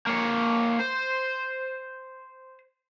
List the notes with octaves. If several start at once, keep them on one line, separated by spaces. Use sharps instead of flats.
A#3 C#5
C5